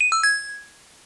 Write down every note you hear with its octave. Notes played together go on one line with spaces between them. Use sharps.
D#7
E6
G#6